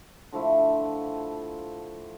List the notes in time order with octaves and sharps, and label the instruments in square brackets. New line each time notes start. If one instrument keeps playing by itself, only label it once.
[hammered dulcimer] D3 F3 A3 E4